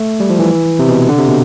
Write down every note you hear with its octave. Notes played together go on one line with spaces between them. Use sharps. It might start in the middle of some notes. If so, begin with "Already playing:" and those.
Already playing: A3
G3
F3
E3
C3
B2
D3
C3
B2